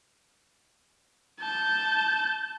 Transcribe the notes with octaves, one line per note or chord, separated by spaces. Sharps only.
A5 G6